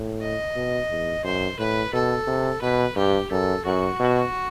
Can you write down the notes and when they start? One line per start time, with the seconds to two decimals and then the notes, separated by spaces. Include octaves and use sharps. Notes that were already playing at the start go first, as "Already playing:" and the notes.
Already playing: A2
0.21 D#5
0.56 B2
0.91 E2
1.24 F#2 C5
1.59 A2 B4
1.93 B2 A4
2.27 C3
2.62 B2 B4
2.96 G2 G4
3.31 F#2 A4
3.65 F#2 F#4
4.00 B2